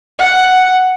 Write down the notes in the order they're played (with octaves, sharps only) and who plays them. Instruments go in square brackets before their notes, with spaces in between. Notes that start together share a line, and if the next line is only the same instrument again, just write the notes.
[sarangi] F#5